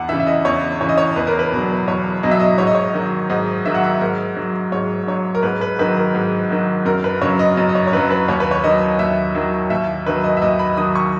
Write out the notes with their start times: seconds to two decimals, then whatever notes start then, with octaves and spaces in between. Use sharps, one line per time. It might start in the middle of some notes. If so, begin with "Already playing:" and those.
Already playing: E2 F#5
0.09 C#3 E3 E5
0.20 E5
0.27 D#5
0.45 E2 C#5
0.81 C#3 E3 C#5
0.89 D#5
0.98 C#5
1.16 E2 B4
1.27 A#4
1.39 B4
1.52 B2 F#3
1.87 E2 C#5
2.23 B2 F#3 D#5
2.31 E5
2.39 D#5
2.58 G#2 C#5
2.67 D#5
2.75 C#5
2.94 D#3 F#3
3.30 G#2 D#5
3.65 D#3 F#3 E5
3.75 F#5
3.84 E5
4.01 G#2 A#4
4.37 F#3
4.72 G#2 C#5
5.07 F#3 C#5
5.35 A#4
5.43 G#2 B4
5.61 B4
5.79 D#3 F#3 B4
5.97 A#4
6.15 G#2
6.50 D#3 F#3
6.85 F#2 A#4
7.04 B4
7.21 C#3 F#3 C#5
7.39 D#5
7.57 F#2 D#5
7.69 D#5
7.75 C#5
7.87 C#5
7.92 C#3 F#3 B4
8.10 B4
8.28 D#2 C#5
8.40 B4
8.51 C#5
8.64 D#3 F#3 D#5
8.99 D#2 E5
9.35 D#3 F#3
9.70 D#2 E5
10.06 D#3 F#3 B4
10.24 D#5
10.37 E5
10.42 D#2 D#5
10.59 B5
10.77 D#3 F#3 D#6
10.96 C#6